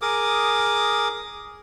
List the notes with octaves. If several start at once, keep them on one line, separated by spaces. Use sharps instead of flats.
G#4 A#4 D6 D#6